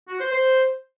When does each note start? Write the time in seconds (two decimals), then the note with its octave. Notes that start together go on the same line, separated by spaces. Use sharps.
0.09 F#4
0.20 C5
0.32 C5